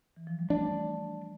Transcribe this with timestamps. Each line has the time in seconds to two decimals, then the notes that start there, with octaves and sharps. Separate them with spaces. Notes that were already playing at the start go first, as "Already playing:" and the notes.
0.16 E3
0.27 F3
0.39 G3
0.50 A3 D4